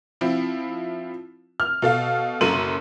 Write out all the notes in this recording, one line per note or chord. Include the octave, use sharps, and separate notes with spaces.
F3 C4 E4 F4
F6
B2 A4 F5
F#1 F#2 A4 C6 D#7 F#7